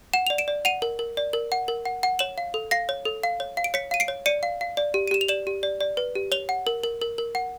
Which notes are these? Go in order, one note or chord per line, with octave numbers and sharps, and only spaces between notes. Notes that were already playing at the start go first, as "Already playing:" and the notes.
F#5 E7
D5 F7
D7 E7
D5
F#5 D#7 F7
A#4
A#4
D5
A#4
F#5
A#4
F#5
F#5
C#5 E7 F#7
F5
A4
F5 A#6 C7
C#5
A4
F5
C#5
F5
D7
C#5 B6 C#7
F5 D#7
C7 D7
C#5
D5 C#7 D#7
F5
F5
D5
G4
D#7
G4 E7
F7
D5 E7 F#7
G4
D5
D5
B4
G4
C#5 F7 G7
F#5
A#4
A#4
A#4
A#4
F#5